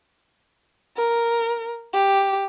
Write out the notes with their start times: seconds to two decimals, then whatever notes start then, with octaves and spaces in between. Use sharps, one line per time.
0.97 A#4
1.93 G4